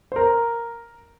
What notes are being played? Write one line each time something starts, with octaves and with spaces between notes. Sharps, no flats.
C5
A#4